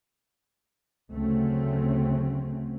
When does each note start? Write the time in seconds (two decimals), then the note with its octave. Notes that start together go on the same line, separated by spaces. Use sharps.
1.11 D2 C#3 F#3 A3 C4 C#4